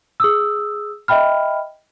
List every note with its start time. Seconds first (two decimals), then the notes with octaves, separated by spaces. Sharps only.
0.20 G#4 D#6 E6
1.08 D#5 E5 G5 B5 F6